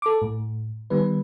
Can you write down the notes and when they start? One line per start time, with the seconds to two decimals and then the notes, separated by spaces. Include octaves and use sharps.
0.02 A4 D6
0.22 A2
0.90 D#3 G3 B3 B4